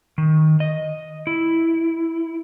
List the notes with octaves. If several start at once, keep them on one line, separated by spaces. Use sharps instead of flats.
D#3
D#5
E4